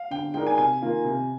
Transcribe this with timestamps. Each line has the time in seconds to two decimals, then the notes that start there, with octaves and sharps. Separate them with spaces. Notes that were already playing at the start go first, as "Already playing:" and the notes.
Already playing: F5
0.11 D3 G5
0.34 G#3 D#4 A#4 D5 G5
0.47 G#5
0.57 C3 G#5
0.82 D#3 A#3 F4
1.05 C3